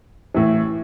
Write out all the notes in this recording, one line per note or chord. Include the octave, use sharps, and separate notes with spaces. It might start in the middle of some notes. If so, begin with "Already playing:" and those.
A2 E3